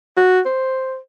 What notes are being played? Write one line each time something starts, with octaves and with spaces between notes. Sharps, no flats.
F#4
C5